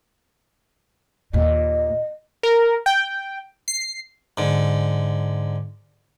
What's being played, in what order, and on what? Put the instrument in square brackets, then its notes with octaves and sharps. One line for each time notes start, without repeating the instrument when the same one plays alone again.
[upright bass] D#2 A#2 [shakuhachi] D#5
[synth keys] A#4
G5
C7
[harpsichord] G#2 D3